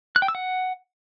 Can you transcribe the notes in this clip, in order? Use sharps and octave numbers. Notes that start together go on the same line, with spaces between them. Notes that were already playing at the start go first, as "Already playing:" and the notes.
F#6
G5
E6
F#5